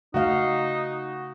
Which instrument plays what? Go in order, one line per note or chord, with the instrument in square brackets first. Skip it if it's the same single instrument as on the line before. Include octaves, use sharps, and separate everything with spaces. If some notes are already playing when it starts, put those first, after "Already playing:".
[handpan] C#3 A3 F5 [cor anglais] D#4 [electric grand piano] F#4